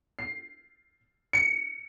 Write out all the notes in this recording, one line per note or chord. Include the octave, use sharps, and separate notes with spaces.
C7
C#7